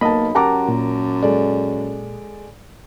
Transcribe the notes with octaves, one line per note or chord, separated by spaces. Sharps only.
B1 A#3 D#5 A5 B5
F#2 G4 A#4 F#5 A5 A#5 D6
A#2
G#3 A4 D5